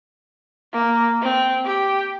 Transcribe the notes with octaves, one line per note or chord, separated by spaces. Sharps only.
A#3
C4
G4